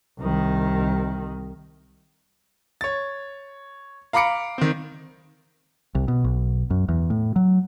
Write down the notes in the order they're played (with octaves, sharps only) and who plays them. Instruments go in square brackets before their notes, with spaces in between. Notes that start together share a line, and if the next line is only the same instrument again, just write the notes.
[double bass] C2 D#3
[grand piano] C#5 A6
F5 A#5 B5 D6 C#7 D7
D#3 C4
[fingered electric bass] C2
B2
B1
F#2
E2
A2
F#3